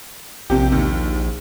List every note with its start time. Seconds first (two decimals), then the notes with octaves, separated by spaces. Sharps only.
0.50 A#1 C3 G4
0.72 D#2